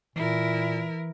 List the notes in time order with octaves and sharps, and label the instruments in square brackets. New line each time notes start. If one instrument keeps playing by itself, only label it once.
[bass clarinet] A#2 [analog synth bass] E3 [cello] E4 A#4